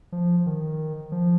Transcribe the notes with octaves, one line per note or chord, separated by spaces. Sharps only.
F3
D#3
F3